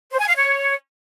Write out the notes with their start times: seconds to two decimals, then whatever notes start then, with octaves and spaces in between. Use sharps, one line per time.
0.12 C5
0.20 G#5
0.28 F5
0.36 C#5